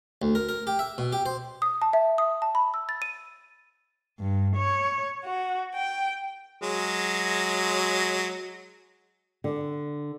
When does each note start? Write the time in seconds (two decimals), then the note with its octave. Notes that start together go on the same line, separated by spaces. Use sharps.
0.22 D2
0.35 A#4
0.49 A#4
0.67 G4
0.79 E5
0.98 B2
1.12 G4
1.26 C5
1.62 D#6
1.82 A5
1.93 E5
2.18 D#6
2.42 A5
2.55 B5
2.74 E6
2.89 A6
3.02 D#7
4.20 G2
4.57 C#5
5.25 F#4
5.76 G5
6.62 F#3 G#3
9.44 D3